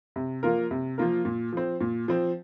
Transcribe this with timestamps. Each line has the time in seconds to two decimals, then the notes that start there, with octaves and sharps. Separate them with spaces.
0.16 C3
0.43 F3 A#3 F4 A#4
0.71 C3
0.98 F3 A#3 F4 A#4
1.25 A#2
1.53 F3 C4
1.81 A#2
2.08 F3 C4